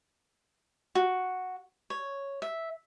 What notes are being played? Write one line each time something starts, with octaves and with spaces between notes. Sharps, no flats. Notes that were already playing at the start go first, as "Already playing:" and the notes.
F#4
C#5
E5